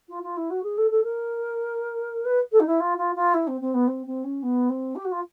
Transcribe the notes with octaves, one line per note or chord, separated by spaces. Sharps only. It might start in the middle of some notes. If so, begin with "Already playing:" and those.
F4
F4
E4
F#4
G#4
A4
A4
A#4
B4
A4
D#4
E4
F4
F4
F4
E4
C4
C4
B3
C4
C4
C#4
B3
C4
G4
F#4
F4